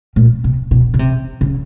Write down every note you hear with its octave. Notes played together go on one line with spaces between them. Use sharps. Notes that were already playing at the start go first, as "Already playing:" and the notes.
A#2
C3
B2
C#3
C3
C#3